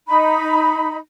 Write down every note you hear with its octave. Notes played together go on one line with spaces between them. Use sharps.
D#4 B5